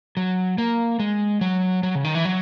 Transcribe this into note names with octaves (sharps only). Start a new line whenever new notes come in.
F#3
A#3
G#3
F#3
F#3
C#3
D#3
E3
F#3